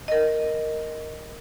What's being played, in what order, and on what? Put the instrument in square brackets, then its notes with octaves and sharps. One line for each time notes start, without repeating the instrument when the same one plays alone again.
[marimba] A#4 D#5